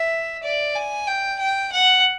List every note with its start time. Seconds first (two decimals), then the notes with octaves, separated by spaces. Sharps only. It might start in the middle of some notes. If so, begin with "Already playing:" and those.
Already playing: E5
0.44 D5
0.75 G#5
1.07 G5
1.39 G5
1.72 F#5